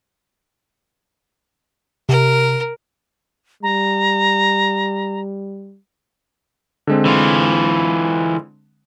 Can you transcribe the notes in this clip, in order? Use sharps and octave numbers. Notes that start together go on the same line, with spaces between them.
C3 A#4
G3 A#5
D3 G#3 C4
E3 F4